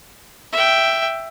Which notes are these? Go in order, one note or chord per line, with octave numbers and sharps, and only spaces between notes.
E5 G5